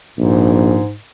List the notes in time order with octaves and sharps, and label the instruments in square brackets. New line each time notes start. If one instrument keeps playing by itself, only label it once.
[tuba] A#1 [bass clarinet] G#2